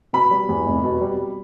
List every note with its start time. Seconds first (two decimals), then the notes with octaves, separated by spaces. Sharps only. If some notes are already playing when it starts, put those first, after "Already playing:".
0.13 B2 B5
0.31 G3
0.49 E2
0.66 F1
0.84 B2
1.01 G3